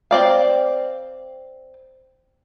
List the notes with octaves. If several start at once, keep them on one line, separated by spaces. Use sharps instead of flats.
C4 D5 F5